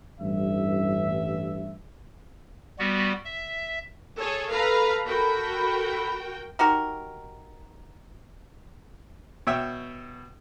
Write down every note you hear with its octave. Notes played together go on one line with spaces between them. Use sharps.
A1 G2 E5
G3 B3 F#4
E5
G#4 A4 C#5
A4 B4 F5 A#5 B5
F#4 A#4 G5
D#4 F#4 G4 A#4
B2 C#5 E5 G5